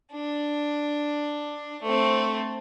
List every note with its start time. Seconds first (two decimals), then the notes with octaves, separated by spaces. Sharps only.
0.13 D4
1.82 A3 C4